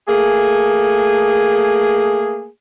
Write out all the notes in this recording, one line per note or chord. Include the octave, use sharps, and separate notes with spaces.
A3 A#3 G#4